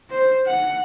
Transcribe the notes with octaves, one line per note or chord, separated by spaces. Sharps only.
C5
F#5